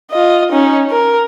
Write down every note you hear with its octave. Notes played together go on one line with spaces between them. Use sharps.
F4 D#5
C#4 D#4
A#4